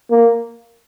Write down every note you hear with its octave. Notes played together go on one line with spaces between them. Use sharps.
A#3